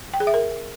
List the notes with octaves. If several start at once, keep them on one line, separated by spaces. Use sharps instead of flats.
G5
G#4
E5
A#4